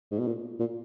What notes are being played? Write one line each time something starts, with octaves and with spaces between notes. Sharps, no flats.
G#2
B2
A#2
A#2